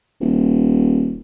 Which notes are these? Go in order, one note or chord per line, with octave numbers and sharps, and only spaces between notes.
D#1